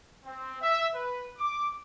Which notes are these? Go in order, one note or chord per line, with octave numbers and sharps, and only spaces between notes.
C4
E5
B4
D6